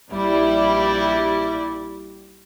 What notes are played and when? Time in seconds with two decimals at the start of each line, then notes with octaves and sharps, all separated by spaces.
0.11 A#1 G3 E4 D5